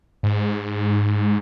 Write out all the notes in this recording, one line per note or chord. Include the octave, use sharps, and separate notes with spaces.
G#2